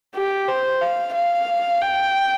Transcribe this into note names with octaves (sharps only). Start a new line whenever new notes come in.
G4
C5
F5
F5
G5